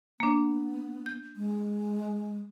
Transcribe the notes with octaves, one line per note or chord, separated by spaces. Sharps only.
A#3 B3 D4
G6
G#3